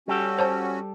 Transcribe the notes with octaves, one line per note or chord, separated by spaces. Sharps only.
G3 C#4 F#4 G4 A4
C5 C#5 A5